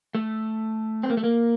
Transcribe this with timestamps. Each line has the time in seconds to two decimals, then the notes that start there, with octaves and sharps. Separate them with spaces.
0.15 A3
1.03 C4
1.10 A#3
1.17 A3
1.24 A#3